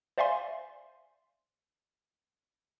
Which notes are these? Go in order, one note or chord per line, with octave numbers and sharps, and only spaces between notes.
C5 D5 E5 F5 G#5 C6